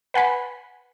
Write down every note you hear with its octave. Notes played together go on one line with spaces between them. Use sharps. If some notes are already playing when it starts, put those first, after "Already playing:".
B4 F#5 G#5 B5